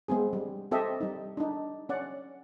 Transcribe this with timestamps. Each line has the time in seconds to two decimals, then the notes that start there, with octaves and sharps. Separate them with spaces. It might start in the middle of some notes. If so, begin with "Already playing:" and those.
0.08 G#3 B3 C4 G#4
0.33 G3
0.71 C4 G4 A4 D#5 E5
1.01 G3 D#4
1.37 D4 D#4
1.89 C#4 D5 F#5